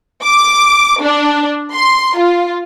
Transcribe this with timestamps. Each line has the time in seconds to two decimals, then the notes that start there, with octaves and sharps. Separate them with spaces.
0.24 D6
1.02 D4
1.74 C6
2.18 F4